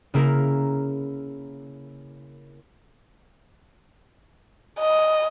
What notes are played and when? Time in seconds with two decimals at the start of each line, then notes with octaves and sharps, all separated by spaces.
0.14 C#3 A#3 E4 A#4
4.79 D#5